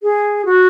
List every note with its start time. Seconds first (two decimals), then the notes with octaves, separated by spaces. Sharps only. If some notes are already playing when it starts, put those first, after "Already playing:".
0.03 G#4
0.45 F#4